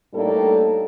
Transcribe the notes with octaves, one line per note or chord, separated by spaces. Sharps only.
A2 G3 A#3 D4 D#4 A4